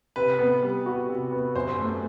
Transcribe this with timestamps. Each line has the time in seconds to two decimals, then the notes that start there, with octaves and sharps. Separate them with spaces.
0.16 C3 B4
0.39 B3
0.62 G3
0.86 F#4
1.09 C3
1.32 B3
1.55 F#2 C5
1.79 A3